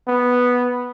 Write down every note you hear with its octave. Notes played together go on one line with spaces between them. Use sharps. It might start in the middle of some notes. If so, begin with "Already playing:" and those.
B3